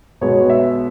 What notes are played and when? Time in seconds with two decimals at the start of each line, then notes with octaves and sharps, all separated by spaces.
0.21 B1 B2 G#3 B3 C#5
0.50 E5